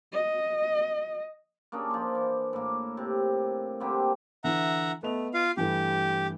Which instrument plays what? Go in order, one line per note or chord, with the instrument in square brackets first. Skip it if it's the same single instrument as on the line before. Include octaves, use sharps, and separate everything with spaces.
[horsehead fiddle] D#5
[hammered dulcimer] A#3 C#4 D4 G#4
F3 C6
E3
A2 A#3
C3
D3 G3 A#3 C4
[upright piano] D3 E3 [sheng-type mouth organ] E5 F#5 A#5
[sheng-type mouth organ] A3 [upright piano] B3 D#5 F7
[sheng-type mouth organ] F4 F5
[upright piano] G2 E3 A3 [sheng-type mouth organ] G4